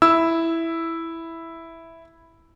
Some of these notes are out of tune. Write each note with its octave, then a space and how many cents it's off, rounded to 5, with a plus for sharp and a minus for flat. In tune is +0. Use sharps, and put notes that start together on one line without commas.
E4 +0 E6 +0